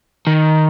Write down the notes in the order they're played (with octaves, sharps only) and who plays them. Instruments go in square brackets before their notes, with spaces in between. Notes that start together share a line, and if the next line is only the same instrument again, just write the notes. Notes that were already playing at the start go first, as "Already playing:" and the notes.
[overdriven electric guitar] D#3